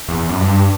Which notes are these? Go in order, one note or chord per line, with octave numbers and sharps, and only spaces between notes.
E2
E2
F#2
G2